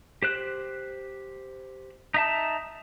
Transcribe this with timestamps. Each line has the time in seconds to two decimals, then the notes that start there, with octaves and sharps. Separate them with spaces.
0.22 G4 C5 F#6
2.14 D#4 E5 A5